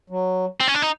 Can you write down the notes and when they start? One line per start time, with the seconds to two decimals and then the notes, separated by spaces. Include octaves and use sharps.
0.10 F#3
0.60 C4
0.68 C#4
0.75 D4
0.82 D#4